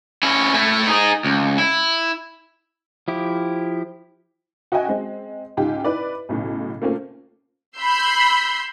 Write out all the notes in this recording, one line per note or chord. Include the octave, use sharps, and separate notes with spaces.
C#4 E4
A3 E4
D#4 G#4
C#2
E4
F3 E4 G4
F#4 D#5 E5 G5 G#5
G#3 C4
C#2 G#2 F4 G4
E4 B4 D5
B1 A2 C#3
A3 A#3 C4 C#4 F4
B5 C6 E6 G6 C7